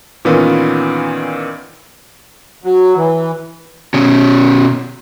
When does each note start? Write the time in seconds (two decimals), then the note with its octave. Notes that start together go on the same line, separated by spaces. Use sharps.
0.25 A#2 D#3 E3 B3 C#4 F4
2.64 F#3
2.97 E3
3.94 B2 C#4